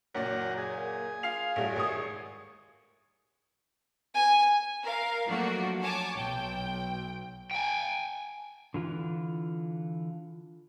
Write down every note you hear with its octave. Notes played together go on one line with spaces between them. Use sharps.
F#1 A#2 F#3 A#4 D5 F#5
G#4
A#3
F4 F5 C7 F7
A1 G3 A3 F#4
G#1 D#2 C#6 D#6
G#5
A#4 F5
F3 F#3 A3 A#3 D4 F#4
C#5 G#5 A5 D6
B1 G5
G5 G#5
D3 E3 F4